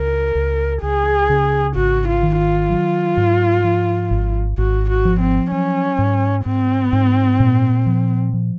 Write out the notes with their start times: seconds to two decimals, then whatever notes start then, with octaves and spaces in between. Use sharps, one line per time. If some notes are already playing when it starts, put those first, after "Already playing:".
Already playing: C#2 A#4
0.35 C#2
0.82 C#2 G#4
1.29 C#3
1.76 G#1 F#4
2.07 F4
2.23 D#3
2.38 F4
2.70 F#3
3.17 G#2
3.64 F3
4.11 G#1
4.58 G#1 F#4
4.89 F#4
5.05 F3
5.20 C4
5.51 F#3 C#4
5.99 G#2
6.46 G#2 C4
6.93 G#2
7.40 A#2
7.86 F3
8.34 F3